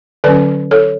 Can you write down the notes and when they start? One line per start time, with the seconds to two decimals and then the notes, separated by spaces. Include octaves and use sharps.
0.24 D3 F#3 C#4 B4 D5
0.71 A4 C#5